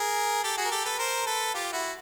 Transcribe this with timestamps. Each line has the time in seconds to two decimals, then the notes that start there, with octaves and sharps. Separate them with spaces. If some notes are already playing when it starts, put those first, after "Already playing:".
Already playing: G#4 A#4
0.44 G4 A4
0.57 F#4 G#4
0.65 A#4
0.71 G4 A4
0.85 A4 B4
0.99 A#4 C5
1.26 A4 B4
1.54 F4 G4
1.72 E4 F#4